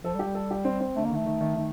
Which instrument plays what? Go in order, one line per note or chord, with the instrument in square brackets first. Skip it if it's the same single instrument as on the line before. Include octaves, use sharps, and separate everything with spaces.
[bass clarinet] F3 [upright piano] A4
[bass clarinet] G3
[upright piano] G4
[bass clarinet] G3
[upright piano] A4
G4
C4
C4
[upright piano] D3 [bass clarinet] A3
[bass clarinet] A#3
[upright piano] D#3
[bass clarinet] A3
[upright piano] D#3
D#3
D#3